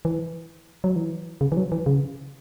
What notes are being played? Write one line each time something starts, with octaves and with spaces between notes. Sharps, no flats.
E3
F#3
E3
C#3
E3
F#3
E3
C#3